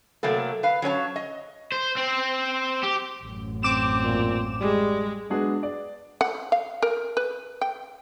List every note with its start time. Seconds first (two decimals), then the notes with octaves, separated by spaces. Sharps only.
0.23 C3 F#3 A3 A#3 A4
0.63 B4 F5
0.82 F#3 C#4 C#5 A5
1.16 D#5
1.72 C5
1.97 C4
2.83 G4
3.23 A1 F#2
3.63 C4 D6 E7
4.04 A#2
4.61 G3 G#3
5.30 G#3 B3 D4 F#4 G#4
5.63 D5
6.21 F#5
6.52 F5
6.82 A#4
7.17 B4
7.61 G5